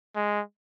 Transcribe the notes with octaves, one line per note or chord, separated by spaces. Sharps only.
G#3